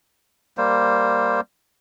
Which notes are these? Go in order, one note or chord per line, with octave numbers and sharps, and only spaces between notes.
G3 A#3 C5